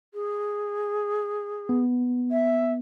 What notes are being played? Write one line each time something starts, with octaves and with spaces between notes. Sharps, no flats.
G#4
B3
E5